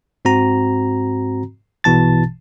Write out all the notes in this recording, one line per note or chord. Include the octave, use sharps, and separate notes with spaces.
G#2 C4 F#4 A#5
A#1 B2 E3 A5 A6